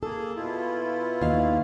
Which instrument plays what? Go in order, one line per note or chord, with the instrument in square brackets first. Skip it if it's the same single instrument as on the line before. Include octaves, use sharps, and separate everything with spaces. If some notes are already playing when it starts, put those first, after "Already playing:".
[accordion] A#3 G#4 [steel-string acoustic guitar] A4
[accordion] B2 E4 F4
[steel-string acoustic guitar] D#2 F5